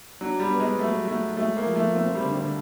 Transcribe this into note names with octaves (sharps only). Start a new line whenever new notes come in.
F#3 D4
G3
B3
G#3
F#3 A3
F#3 A3
G#3 A3
A#3
F3
A3
A3 C4
G3
D3
G3